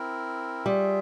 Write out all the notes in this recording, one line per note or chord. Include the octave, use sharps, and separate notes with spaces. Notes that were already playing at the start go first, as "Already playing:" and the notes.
Already playing: C4 E4 A#4
G3 F4 G#4 E5